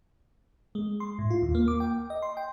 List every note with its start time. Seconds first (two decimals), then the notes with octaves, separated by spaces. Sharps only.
0.75 G#3
1.00 C6
1.19 A2
1.30 F4
1.43 D#2
1.55 A#3
1.68 D6
1.80 G5
2.10 D#5
2.22 C6
2.37 G5